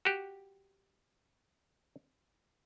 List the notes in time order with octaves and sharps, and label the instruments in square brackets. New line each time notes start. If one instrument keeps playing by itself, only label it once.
[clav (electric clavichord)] F#4 G4